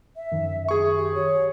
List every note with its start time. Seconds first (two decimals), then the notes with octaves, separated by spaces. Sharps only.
0.17 E5
0.32 F#2 D#3
0.69 G#4 C#6
0.97 G4
1.15 C#5